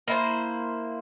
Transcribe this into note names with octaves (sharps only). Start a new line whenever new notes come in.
A#3 E4 C5